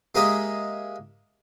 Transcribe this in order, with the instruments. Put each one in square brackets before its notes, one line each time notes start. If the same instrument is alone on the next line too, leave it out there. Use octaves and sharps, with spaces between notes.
[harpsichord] G#3 A#3 G4 G#4 D#5 E5